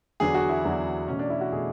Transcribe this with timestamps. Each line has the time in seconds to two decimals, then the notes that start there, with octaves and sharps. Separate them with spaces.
0.20 E2 D3 F#3 B3 G#4
0.34 F#4
0.49 E4
0.64 E2 D3 F#3 B3
1.08 E2 B2 A3 C#4
1.19 D4
1.30 E4
1.41 F#4
1.52 B2 A3 G#4